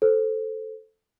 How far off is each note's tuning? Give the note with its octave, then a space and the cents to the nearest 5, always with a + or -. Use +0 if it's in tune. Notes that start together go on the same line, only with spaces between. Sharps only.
A4 +0 C5 +0